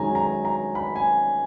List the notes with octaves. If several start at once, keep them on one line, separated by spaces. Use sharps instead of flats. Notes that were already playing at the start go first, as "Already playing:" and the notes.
Already playing: F#2 D#3 G#3 C#4 G#5 A#5
A#5
A#5
B5
G#5